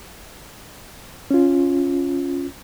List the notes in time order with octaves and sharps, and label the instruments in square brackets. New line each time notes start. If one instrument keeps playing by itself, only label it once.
[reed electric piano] C#4 F4